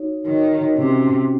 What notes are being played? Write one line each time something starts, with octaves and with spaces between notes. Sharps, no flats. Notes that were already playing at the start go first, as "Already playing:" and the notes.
Already playing: D#4 F#4 C#5
D#3 D#4 F#4 C#5
C3 C#4 F#4 C5